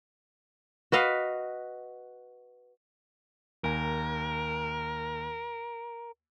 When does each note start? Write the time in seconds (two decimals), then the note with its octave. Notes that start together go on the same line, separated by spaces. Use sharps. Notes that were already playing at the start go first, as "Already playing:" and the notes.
0.92 F#4 B4 D#5 F5
3.64 D#2 A#4 G#5 A#5